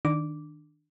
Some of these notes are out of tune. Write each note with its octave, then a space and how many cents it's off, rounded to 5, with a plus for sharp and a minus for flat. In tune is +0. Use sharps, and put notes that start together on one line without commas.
D#3 +0 D4 +15 D6 -10